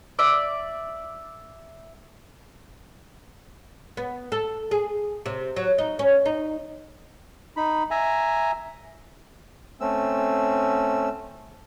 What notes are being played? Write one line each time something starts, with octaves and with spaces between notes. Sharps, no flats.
D5 E5
B3
A4
G#4
C3
F#3
D#4
C#4
D#4
D#4 B5
E5 G#5 A#5
A3 C4 C#4 E6